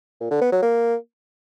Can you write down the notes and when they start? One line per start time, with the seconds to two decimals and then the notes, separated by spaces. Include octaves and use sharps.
0.21 A#2
0.31 D3
0.42 B3
0.52 F#3
0.63 A#3